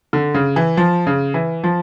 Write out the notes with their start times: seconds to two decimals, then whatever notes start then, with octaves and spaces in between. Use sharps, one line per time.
0.13 D3
0.35 C#3
0.56 E3
0.77 F3
1.07 C#3
1.34 E3
1.64 F3